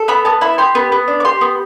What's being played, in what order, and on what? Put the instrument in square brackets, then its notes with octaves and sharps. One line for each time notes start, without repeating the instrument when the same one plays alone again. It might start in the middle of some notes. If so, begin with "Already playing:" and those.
Already playing: [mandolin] A4
B3 B5
B3 A5
E4 B5
G4 C6
B3
B3
D4
D6
G4 C6
B3